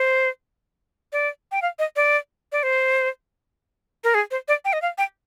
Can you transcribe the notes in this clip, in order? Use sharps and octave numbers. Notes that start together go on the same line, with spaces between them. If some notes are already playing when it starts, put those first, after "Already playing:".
Already playing: C5
D5
G5
F5
D#5
D5
D5
C5
A#4
G#4
C5
D5
G5
D#5
F5
G5